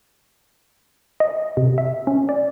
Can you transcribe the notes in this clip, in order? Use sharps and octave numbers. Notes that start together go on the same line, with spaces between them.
D#5
C3
E5
C#4
D5